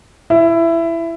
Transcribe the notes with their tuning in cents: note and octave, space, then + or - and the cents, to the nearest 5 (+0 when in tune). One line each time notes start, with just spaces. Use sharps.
E4 +15